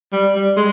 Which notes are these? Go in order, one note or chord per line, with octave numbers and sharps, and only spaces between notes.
G3
G3
G#3